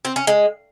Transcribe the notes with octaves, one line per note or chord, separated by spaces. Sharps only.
C4
C#4
G#3